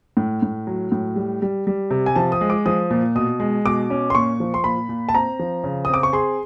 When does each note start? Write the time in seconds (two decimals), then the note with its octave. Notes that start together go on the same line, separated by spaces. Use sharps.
0.17 A2
0.42 A2
0.67 F#3
0.92 A2
1.16 G3
1.42 G3
1.67 G3
1.91 C3
2.06 G#5
2.16 F3 A5
2.32 D#6
2.41 G#3
2.50 D6
2.66 F3 D#6
2.90 A#2
3.15 B2 D#6
3.40 G#3
3.65 B2 D6
3.90 C#4
4.10 C6
4.15 A#2 C#6
4.40 F3
4.54 C6
4.64 A#2 B5
4.89 A#2
5.09 A5
5.14 C4 A#5
5.39 F3
5.64 C#3
5.85 C4 D#6
5.94 D6
6.03 C#6
6.13 G#4 C6